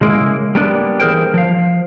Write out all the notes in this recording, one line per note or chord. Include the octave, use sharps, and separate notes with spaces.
C#3 G#3 A#3 E4
G3 A#3 B3 D4
E3 G#4 A#4 C5 G5
F3 F5